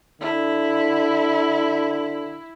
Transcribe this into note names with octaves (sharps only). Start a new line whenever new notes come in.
D3 E4